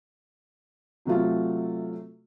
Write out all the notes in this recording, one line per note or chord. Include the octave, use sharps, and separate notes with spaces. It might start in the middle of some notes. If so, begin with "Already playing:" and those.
C3 F#3 A3 F4